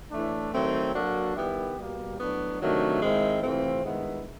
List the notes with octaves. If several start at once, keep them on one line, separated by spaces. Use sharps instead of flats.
A2 E3 A3 D4
D#3 F#3 A3 C4
F#3 A#3 D4 F#4 A4
D#3 G3 B3 E4 G4
B2 G3 A#3
A2 F#3 B3 D4 F#4
C3 D#3 F#3 A3 D4
G#2 D#3 G#3 C4 E4
C3 E3 A3 C4 F4
G2 D#3 G#3 B3 E4